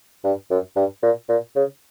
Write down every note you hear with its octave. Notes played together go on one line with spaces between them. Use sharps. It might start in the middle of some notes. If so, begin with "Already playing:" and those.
G2
F#2
G2
A#2
A#2
C#3